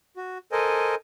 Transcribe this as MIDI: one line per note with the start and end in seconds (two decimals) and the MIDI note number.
0.16 0.38 66
0.52 0.95 69
0.52 0.95 70
0.52 0.95 72
0.52 0.95 75
0.52 0.95 80